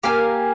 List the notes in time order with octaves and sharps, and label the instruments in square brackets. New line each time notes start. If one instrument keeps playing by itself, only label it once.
[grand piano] A#3 [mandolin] G4 A#4 F5 G#5